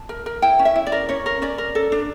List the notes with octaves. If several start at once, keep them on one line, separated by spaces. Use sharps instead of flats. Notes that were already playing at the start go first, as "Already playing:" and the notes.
Already playing: A5
A#4
A#4
E4 G5
C#4
E5
E4
D5
A#4
C#4 C#5
A#4
C#4 D5
A#4
A4
D4